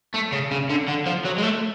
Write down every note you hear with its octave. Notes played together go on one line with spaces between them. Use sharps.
A3
C#3
C#3
D3
D3
F3
F#3
G#3
A3